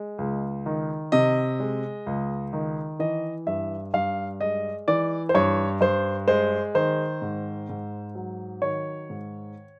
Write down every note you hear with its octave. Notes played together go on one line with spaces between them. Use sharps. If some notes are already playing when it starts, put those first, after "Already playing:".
Already playing: G#3
C#2
D#3
C3 D#5
G#3
C#2
D#3
E3 D#5
G2 E5
G2 F5
G#3 D#5
E3 D5
C5
G2 C#5
G2 C5
G#3 C5
D#3 C5
G#2
G#2
F#3
D#3 C#5
G#2